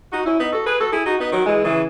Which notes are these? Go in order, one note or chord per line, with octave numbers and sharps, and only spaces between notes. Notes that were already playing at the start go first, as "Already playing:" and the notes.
D#4 F#4
C#4 E4
B3 D#4
F#4 A4
G#4 B4
F#4 A4
E4 G#4
D#4 F#4
B3 D#4
D#3 F#3
E3 G#3
C#3 E3